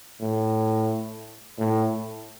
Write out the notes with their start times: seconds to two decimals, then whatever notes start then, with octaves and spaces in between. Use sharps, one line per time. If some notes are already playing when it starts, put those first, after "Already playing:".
0.22 A2
1.59 A2